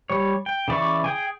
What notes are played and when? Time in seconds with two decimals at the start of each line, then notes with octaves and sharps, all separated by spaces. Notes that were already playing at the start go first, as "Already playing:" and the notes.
0.10 G3 C#5
0.46 G5
0.68 C#3 E3 D5 E5 C#6
1.04 G#4 G5 G#5